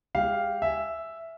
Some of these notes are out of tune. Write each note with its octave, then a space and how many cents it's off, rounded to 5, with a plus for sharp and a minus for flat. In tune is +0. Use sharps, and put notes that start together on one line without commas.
G#3 -30 G4 -5 F5 +0
E5 +0 G#5 +0